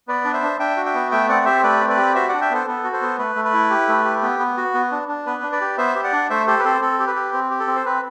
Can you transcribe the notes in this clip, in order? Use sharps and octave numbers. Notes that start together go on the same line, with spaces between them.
B3 B4 D5
D4
C5 E5
D4
D4 E5 G5
F#4
E5 G5
B3
A3 E5 G5
C4 D5 F#5
G4 C5 E5
A3 B4 D5
C4
B4 D5
G4
F#4 C5 E5
D4 D5 F#5
E5 G5
B3 A4 C5
B3 A4
F#4
A4 C5
B3
A3 B4
A3
B4
E4
G4
A3
G4
B3
B3
F#4
B3
D4
D4
B3 B4
D4
B4 D5
G4
B3 C5 E5
G4
D5 F#5
D4
A3 C5 E5
G4 A4 C5
B4
C4 A4 C5
C4 A4
G4
B4
G4
C4
G4
A4
C4
C5
C4 B4